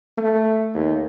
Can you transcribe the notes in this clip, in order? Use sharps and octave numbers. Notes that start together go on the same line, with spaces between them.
A3
D#2